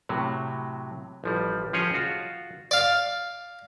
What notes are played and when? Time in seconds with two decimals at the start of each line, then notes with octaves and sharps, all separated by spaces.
0.09 A2 C3 F#3
1.24 A1 F3 G3
1.73 F3 C#4 G4 G#4 C#5 D#5
1.94 F4 F#4
2.71 D5 F5